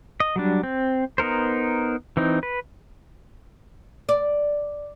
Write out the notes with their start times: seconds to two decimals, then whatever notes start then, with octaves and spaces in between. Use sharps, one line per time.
0.20 D#5
0.36 F#3 G3 D4
0.64 C4
1.18 B3 D#4 A#4 C5
2.17 E3 C4 D#4
2.43 B4
4.09 D5